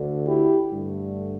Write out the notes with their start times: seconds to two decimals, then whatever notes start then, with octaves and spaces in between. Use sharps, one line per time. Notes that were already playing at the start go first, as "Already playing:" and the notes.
Already playing: D2 D3 A3
0.27 E4 G4
0.71 G2 D3 A3